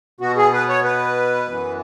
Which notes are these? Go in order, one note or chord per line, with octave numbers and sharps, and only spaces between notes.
B2 B3 F#4
G#4
B4
C#5
B4
F#2 E3 B3